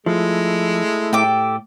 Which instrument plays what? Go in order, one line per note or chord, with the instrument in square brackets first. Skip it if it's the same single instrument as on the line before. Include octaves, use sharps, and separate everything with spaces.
[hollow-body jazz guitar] F3 [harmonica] G#3 [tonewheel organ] A3 E4
[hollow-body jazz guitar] A2 [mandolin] G4 A4 D6